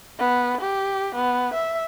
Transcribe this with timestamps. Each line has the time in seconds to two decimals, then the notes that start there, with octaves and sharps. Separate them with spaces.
0.19 B3
0.61 G4
1.15 B3
1.54 E5